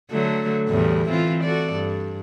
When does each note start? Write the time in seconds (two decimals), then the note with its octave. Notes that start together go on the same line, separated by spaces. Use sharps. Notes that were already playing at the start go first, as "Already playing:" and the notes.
0.11 D3 F#3 A3
0.69 E2 A2 G3
1.09 E3 C4 F4
1.43 F#4 A4 D5
1.73 G2